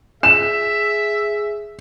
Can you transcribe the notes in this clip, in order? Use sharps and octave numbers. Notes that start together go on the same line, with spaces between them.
G#4 E5 E7